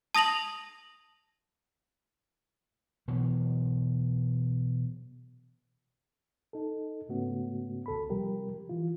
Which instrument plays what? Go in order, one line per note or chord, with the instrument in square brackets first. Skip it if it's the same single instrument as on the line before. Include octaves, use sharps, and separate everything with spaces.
[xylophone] A5 D#6 A#6 F7 F#7
[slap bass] B2 E3 F#3
[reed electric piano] D#4 A4
G#2 C#3 A3 B3 C#4 F#4
C#2 A4 B5
C3 F3 G3 G4 A#4
E3 F4